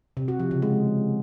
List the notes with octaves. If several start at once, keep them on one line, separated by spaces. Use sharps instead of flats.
C3
F#4
F3
C#3
G#3